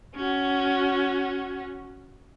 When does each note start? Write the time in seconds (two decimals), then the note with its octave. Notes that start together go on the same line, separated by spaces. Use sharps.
0.16 C#4 F#4